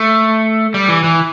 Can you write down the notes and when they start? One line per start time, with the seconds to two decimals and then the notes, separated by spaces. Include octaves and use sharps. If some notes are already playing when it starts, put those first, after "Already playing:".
Already playing: A3
0.74 G3
0.89 E3
1.04 E3